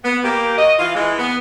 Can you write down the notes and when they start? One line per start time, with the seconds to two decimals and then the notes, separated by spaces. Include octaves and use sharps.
0.04 B3
0.24 A#3 G4
0.58 F#4 D#5
0.79 E3 F4
0.95 E3 G#3
1.18 B3